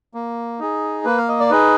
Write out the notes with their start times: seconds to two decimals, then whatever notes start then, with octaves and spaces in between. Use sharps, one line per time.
0.14 A#3
0.60 D#4 G#4
1.05 A#3 B4
1.18 F5
1.29 D#5
1.40 D5
1.51 D#4 G#4 B4